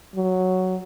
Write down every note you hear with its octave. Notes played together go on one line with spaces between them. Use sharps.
F#3